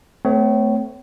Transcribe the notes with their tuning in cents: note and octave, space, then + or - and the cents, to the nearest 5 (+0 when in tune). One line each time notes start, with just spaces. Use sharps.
A3 +0 C4 -45 C#5 +0